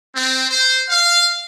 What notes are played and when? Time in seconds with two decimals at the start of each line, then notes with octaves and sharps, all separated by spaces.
0.14 C4
0.50 C5
0.89 F5